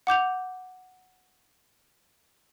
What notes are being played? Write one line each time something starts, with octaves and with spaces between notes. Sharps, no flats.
F#5 D6 G6 F7